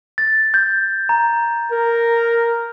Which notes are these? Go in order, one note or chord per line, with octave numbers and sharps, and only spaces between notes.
A6
G6
A#5
A#4